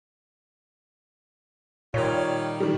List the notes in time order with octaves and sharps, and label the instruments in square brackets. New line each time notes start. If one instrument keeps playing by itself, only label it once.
[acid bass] A#2 [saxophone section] D#3 G3 F4 [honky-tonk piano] C#5
[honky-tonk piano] D#3 G3